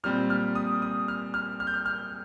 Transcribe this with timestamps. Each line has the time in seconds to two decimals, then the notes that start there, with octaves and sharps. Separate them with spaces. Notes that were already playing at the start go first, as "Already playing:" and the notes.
0.04 A#2 G3 C4 F6
0.30 F6
0.55 D#6
0.82 D#6
1.08 F6
1.34 F6
1.60 F6
1.67 G6
1.74 F6
1.86 F6